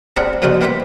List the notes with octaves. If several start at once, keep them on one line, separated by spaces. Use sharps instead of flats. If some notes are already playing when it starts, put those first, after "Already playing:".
C4 D4 G#4 F5 F#5 A#5
A#2 C#3 F3 D#4 F4 F#4
B2 A#3 E4 G4 C5 E5